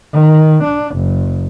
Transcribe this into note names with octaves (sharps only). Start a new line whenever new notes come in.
D#3
D4
F#1